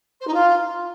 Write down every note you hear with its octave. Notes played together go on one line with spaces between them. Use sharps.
C5
D#4
F4